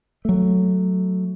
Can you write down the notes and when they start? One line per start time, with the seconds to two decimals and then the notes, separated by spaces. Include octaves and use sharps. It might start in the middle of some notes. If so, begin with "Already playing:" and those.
0.25 F#3 A3